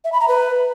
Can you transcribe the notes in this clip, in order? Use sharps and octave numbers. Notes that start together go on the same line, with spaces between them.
E5
B5
A#5
B4